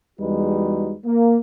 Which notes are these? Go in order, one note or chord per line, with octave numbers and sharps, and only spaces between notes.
E2 G3 G#3 D#4 F#4 B4
A#3